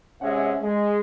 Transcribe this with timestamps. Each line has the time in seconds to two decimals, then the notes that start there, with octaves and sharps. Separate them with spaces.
0.21 C3 G#3 C#4 E5 F#5
0.61 G#3